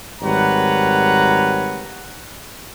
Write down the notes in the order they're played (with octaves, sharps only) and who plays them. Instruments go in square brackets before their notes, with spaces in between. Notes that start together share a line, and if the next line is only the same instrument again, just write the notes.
[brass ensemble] G#1 G3 B4 C#5 F#5 A#5